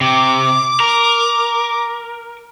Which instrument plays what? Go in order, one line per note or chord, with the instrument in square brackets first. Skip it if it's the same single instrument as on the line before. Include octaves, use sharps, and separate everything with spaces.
[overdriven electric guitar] C3 [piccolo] D6
[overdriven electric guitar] A#4